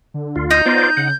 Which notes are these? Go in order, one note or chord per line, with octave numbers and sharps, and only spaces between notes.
D3
D2 F4
D#4 G6
B3 F4 C5 D5
C#3 F#5